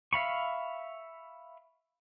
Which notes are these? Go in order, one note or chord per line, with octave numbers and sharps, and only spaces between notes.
E5 F5 B5 C#6